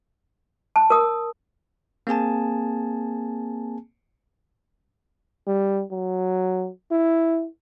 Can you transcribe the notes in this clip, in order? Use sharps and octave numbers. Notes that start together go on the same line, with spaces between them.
A5
A#4 D#6
A#3 C4 G#4 G#5 A5
G3
F#3
E4